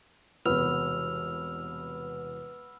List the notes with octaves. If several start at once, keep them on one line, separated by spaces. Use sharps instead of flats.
E1 C2 B3 E6 F6 F7